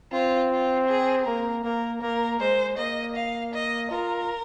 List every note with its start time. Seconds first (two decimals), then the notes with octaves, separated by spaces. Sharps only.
0.12 C4 F4
0.51 F4
0.88 G#4
1.25 A#3 A#4
1.64 A#3 A#4
2.01 A#3 A#4
2.39 G#3 C5
2.78 A#3 D#5
3.16 F5
3.54 D#5
3.91 F4 A#4